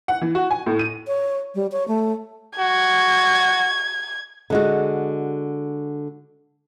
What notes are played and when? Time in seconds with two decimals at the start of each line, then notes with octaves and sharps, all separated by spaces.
0.08 F#5
0.21 E3
0.35 F#4
0.51 G#5
0.66 A2
0.79 D#7
1.07 C#5
1.55 G3
1.72 C#5
1.88 A3
2.59 F#4 G#6
4.50 D3 G#3 F#4